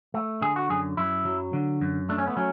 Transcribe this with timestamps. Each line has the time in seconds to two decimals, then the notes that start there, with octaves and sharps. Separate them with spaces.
0.14 A3
0.42 D3 G#4
0.56 F#4
0.70 F#2 G#4
0.97 F#2 E4
1.25 F#3
1.53 D3
1.81 F#2
2.09 A3 D4
2.18 C#4
2.27 B3
2.37 F#3 C#4